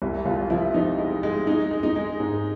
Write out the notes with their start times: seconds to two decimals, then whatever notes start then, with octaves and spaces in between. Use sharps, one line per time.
0.02 C2 E4
0.26 C2 F4
0.50 F3 E4
0.74 F3 D#4
0.98 G#3
1.23 G#3
1.47 G#3 D#4
1.71 G#3
1.83 D#4
1.96 G#3
2.20 G#2